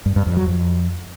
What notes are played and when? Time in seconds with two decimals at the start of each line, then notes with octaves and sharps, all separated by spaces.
0.06 G2
0.16 G2
0.26 F2
0.37 F#3
0.47 F2